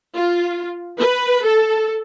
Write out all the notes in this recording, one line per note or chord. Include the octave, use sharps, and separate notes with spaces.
F4
B4
A4